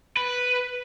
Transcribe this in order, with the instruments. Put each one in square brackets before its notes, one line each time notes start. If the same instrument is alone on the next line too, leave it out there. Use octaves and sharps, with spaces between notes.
[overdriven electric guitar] B4